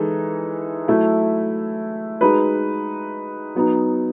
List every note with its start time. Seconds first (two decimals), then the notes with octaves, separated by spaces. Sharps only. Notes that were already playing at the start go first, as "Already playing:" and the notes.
Already playing: E3 G#3 D#4 A4
0.88 F#3 A3 E4 A4
2.21 G#3 D#4 F#4 B4
3.55 F#3 B3 D#4